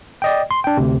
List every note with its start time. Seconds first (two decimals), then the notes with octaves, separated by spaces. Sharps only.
0.22 D5 D#5 G5
0.51 C6
0.64 D4 G5
0.77 D2 C3